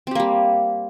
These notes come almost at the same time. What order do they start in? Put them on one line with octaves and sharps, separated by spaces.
C4 G4 A#3 G3